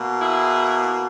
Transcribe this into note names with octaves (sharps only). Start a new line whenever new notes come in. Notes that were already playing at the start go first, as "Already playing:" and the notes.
Already playing: B2 A#3
E4 G#4